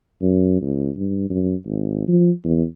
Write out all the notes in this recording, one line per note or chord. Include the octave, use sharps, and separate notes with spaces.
F#2
C#2
G2
F#2
G#1
F3
E2